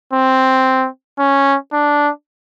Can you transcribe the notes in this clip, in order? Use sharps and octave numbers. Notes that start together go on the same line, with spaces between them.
C4
C#4
D4